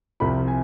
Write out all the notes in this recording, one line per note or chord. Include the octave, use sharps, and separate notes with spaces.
C2 C3 F3 B5
G#5